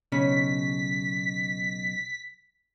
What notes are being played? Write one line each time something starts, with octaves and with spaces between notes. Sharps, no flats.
B1 C#3 C#4 B6